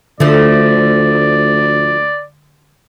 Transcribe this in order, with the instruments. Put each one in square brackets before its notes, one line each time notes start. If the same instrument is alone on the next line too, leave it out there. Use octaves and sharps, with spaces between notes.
[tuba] D2 [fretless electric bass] D3 [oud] F3 A3 [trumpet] D5